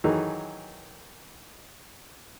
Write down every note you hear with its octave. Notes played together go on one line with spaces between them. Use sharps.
D#3 E3 F#3 D#4 G#4 A4